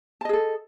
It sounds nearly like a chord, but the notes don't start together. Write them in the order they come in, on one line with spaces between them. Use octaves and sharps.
A5 D#5 G#4 A4